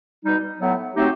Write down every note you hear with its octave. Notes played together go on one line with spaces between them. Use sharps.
B2 G3 D#4
A2 F#3 B3
F#3 A3 C4 D#4 G4